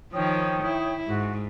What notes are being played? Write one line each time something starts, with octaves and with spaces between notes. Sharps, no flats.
D#3 F3 C#5 G5 D#6
E4
G#2 F#4